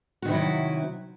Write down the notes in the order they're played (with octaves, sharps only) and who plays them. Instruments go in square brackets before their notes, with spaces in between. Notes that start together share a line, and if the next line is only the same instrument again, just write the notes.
[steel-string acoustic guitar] F#4
D#3
C3
E4
F#3